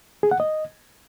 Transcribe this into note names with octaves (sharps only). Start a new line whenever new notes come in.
G#4
F#5
D#5